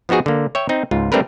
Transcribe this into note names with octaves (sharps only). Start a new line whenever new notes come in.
F3 B3 D#4 F#4 G#4
D3 A#3
C#5 E5 G5
C4 D#4
C#2 G#2 F4
G3 A3 C4 D4 A#4 B4